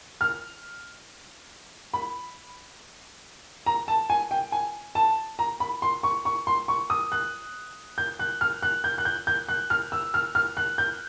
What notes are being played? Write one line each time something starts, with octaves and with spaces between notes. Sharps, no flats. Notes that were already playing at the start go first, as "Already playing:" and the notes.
F6
B5
A#5
A5
G#5
G5
G#5
A5
A#5
B5
C6
C#6
C#6
C6
C#6
D#6
F#6
G6
F#6
F6
F#6
G6
F#6
G6
G6
F#6
F6
E6
F6
F6
F#6
G6